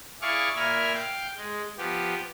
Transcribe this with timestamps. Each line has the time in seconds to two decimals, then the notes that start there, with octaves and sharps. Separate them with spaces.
0.22 E4 G#4 D5 F5 C#6
0.56 A#2 A#4 E5 G#5 B5 F6
0.94 F5 G5 G6
1.37 G#3
1.78 F3 B3 G4